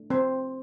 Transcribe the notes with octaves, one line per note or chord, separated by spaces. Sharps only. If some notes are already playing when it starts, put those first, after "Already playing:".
Already playing: A3 D4
C4 C5